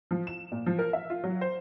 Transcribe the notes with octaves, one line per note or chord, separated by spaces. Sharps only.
F3
E7
A#2
F3
A#4
E5
F4
F#3
C5